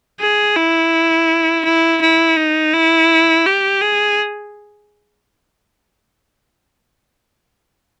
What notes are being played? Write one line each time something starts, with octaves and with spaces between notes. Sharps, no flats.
G#4
E4
E4
E4
D#4
E4
G4
G#4